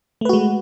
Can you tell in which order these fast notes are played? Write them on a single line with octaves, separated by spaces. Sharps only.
A3 B4 F#4 G#3